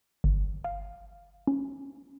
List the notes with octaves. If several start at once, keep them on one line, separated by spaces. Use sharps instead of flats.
G1
F5
C#4